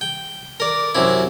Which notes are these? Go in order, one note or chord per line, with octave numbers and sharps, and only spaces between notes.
G5
A#4 D5
F#2 C3 E4